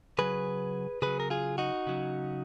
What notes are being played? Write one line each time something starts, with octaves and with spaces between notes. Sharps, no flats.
C#3 F#3 G#4 B4
C#3 F#3 G#4 B4
A#4
F4 G#4
D#4 F#4
C#3 F#3